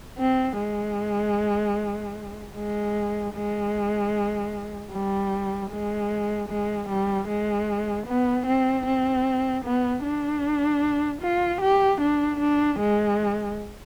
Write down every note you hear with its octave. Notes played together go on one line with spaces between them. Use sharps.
C4
G#3
G#3
G#3
G3
G#3
G#3
G3
G#3
B3
C4
C4
B3
D4
F4
G4
D4
D4
G#3